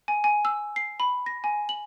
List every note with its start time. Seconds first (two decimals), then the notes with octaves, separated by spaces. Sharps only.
0.08 G#5
0.24 G#5
0.45 E6
0.76 C7
1.00 B5
1.26 A#6
1.44 G#5
1.69 F#7